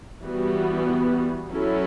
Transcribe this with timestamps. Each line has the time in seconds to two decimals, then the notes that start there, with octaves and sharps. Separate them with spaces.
0.23 E3 G3 B3 F#4
1.50 F#3 C#4 E4 A4